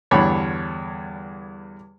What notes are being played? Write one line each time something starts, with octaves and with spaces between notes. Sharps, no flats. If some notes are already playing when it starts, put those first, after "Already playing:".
E2 G2 D3 C#5 B5